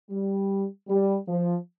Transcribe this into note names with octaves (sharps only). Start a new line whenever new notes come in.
G3
G3
F3